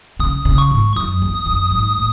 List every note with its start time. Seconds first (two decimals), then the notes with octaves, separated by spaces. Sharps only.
0.20 C#3 D#6
0.45 C#3
0.58 C#6
0.71 G#2
0.96 F#2 D#6
1.22 E2
1.46 F#2
1.71 G#2
1.98 A2